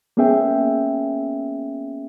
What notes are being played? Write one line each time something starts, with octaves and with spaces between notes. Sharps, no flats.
A#3 B3 C#4 G#4 E5 G5